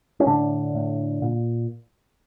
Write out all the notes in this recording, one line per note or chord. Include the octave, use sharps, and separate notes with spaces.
C#4
A2 D3 D4
A2
A#2